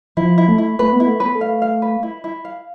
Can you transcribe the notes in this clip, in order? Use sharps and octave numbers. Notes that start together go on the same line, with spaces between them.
F3 E4
E4
A3
E4
A3 B4
B3
E4
A3
B3 B4
A3
F5
F5
B4
E4
E4
F5